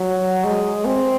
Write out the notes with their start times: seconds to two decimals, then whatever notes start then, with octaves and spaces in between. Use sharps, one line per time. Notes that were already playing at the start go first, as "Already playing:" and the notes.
Already playing: F#3
0.44 G#3
0.86 C4